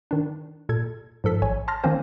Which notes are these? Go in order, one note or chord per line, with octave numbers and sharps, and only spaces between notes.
D#3 D4
A#2 A4 G#6
G#2 F3 A4 B6
A1 C#5 G#5
A5 C6 F6 A#6
D#3 E3 A#3 C4 C#4 C5